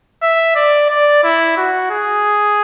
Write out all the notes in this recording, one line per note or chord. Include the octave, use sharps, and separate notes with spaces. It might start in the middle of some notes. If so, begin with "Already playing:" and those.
E5
D5
D5
E4
F#4
G#4